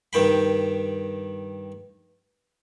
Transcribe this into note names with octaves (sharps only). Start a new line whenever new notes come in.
G2 D#3 G5 B5